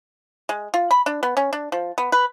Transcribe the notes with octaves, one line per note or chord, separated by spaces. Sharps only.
G#3
F4
B5
D4
B3
C#4
D4
F3
B3
B4